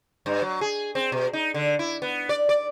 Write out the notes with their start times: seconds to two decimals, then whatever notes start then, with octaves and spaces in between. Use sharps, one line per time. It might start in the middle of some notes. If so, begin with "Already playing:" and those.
0.26 G2
0.42 F#3
0.61 G#4
0.95 C4
1.12 B2
1.33 D#4
1.54 D3
1.79 E4
2.02 B3
2.29 D5
2.49 D5